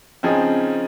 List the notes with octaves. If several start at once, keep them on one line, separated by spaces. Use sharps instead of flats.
C#3 F3 C4 D#4 G#4